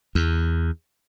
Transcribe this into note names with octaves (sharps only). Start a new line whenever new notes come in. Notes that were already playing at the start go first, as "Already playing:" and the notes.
E2